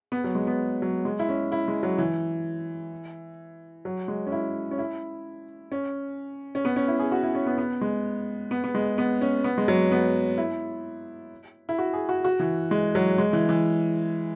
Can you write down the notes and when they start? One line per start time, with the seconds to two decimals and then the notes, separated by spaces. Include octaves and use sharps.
0.12 B3
0.24 F#3
0.35 G#3
0.47 B3
0.82 F#3
1.05 G#3
1.19 E4
1.29 C#4
1.52 E4
1.68 G#3
1.83 F#3
1.98 E3
3.85 F#3
4.08 G#3
4.27 C#4
4.32 E4
4.71 C#4
4.78 E4
5.72 C#4
6.55 C#4
6.65 B3
6.76 C#4
6.88 E4
6.99 G#4
7.12 F#4
7.23 E4
7.35 C#4
7.46 B3
7.58 B3
7.81 G#3
8.51 B3
8.64 B3
8.75 G#3
8.98 B3
9.21 C#4
9.44 B3
9.58 G#3
9.68 F#3
9.91 B3
10.38 E4
11.69 E4
11.78 F#4
11.94 G#4
12.09 F#4
12.24 F#4
12.40 E3
12.71 G#3
12.95 F#3
13.18 G#3
13.33 E3
13.49 E3